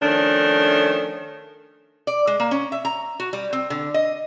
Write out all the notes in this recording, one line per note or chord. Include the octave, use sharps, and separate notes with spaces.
D#3 F3 A3 C#4 D4
D5
G#3
A#3
C#4
E5
A#5
F#4
G3
C4
D3
D#5